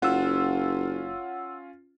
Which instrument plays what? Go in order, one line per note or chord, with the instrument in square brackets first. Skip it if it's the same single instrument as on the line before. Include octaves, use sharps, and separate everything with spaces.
[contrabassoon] F#1 [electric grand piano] C#4 F4 [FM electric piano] F#5 E6